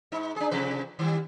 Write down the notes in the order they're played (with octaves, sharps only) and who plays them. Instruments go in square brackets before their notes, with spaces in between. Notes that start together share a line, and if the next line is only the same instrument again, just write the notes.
[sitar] G#2 D#4
D4 G#4
C3 F3 B4
D#3 G3